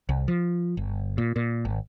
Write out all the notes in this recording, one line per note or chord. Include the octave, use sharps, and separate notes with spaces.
C2
F3
G1
A#2
A#2
G#1